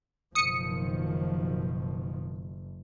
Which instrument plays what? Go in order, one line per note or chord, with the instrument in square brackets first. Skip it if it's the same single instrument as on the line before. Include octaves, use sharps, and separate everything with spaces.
[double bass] F#1 [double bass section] B2 D#3 F3 [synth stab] D#6 C#7